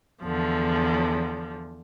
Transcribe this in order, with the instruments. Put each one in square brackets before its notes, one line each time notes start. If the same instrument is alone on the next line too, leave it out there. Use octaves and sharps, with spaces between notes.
[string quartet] E2 D3 F3